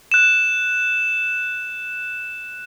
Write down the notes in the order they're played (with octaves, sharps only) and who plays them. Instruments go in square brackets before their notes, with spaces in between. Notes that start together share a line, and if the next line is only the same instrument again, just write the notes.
[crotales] F#6 E7